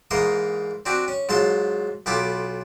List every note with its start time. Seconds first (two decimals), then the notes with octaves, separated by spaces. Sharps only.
0.11 G#2 E3 A#3 A#5 C6 D#6
0.86 C4 D4 F#4 G4
1.08 C#4
1.29 G#2 F#3 F4 A5 C6
2.06 B1 B3 F4 G4 A4 D6